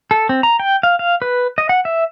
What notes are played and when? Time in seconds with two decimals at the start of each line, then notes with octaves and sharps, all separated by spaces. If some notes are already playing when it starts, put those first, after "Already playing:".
0.11 A4
0.29 C4
0.43 A#5
0.60 G5
0.83 F5
0.99 F5
1.22 B4
1.58 D#5
1.69 F#5
1.85 E5